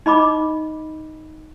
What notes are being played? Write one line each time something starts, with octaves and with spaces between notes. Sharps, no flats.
D#4 D#5 B5 D6